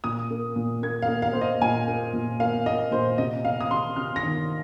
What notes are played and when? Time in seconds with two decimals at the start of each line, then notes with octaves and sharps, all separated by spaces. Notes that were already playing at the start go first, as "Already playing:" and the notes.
0.04 A#2 D#6
0.31 A#3
0.56 A#2
0.83 A#3 G#6
1.02 F5
1.08 A#3
1.22 F5
1.33 A#3 C5
1.41 D#5
1.61 A#2 G#5
1.88 A#3
2.13 A#2
2.40 A#3 F5
2.66 A#3 D#5
2.91 A#2 C5
3.18 C3 D#5
3.45 C3 F5
3.61 D#6
3.70 C3 C6
3.96 C3 F6
4.16 A#6
4.23 D#3